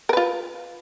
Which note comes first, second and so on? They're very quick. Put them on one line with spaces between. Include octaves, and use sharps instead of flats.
A#4 B4 F4